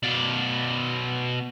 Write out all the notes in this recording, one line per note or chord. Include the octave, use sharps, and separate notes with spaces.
B2 D5